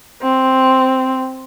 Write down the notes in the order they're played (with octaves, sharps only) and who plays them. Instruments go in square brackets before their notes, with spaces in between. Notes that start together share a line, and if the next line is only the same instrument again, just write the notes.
[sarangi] C4